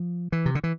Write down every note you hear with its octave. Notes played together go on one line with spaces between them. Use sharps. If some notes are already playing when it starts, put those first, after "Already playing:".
Already playing: F3
E3
C3
D3
E3